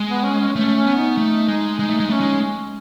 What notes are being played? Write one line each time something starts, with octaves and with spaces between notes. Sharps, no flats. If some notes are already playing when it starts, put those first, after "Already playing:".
Already playing: G#3
B3
C#4
C#4
A3 C#4
C#4
B3
D#4
A3
G#3
G#3 D#4
A3
G#3
A3 C#4
G#3